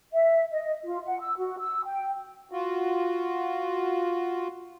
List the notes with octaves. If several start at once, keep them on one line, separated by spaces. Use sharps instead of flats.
E5
D#5
F4
F#5
E6
F#4
E6
G5
F4 F#4